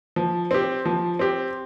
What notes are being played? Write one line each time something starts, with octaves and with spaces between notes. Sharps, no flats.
F3
C4 G4
F3
C4 G4